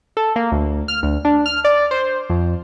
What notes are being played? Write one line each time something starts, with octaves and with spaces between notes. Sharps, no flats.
A4
A#3
D2
F6
D2
D4
F6
D5
C5
F2